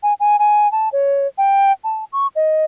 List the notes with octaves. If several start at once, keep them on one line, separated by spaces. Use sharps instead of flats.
G#5
G#5
G#5
A5
C#5
G5
A5
C#6
D#5